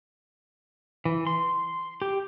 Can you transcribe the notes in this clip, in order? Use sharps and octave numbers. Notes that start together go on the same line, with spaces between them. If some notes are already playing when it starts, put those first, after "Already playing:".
E3
C6
G4